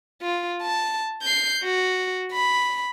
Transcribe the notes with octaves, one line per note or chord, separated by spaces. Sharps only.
F4
A5
G6 C7
F#4
B5